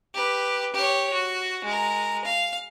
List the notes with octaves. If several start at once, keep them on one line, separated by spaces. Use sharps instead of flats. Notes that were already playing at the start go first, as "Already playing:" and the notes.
G4 B4
G4 C#5
F#4
G#3 A#4
F5